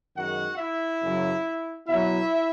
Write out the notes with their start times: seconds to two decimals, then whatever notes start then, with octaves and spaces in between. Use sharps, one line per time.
0.15 F#2 D#3 G#3 F#4 F#5
0.58 E4 E5
1.01 F#2 C#3 F#3
1.87 B2 F#3 E4 E5